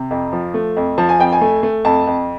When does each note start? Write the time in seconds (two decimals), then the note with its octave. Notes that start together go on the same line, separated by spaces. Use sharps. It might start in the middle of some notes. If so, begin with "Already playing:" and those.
Already playing: C3
0.11 F2
0.33 F3
0.54 A3
0.77 F2
0.98 F3 A5
1.09 G#5
1.19 F2 G5
1.33 G#5
1.41 A3
1.63 A3
1.85 F2 A5
2.07 F2